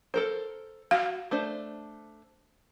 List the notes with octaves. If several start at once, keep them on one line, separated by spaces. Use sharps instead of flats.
A4 A#4 C5
F#4 F5
A3 D4 C5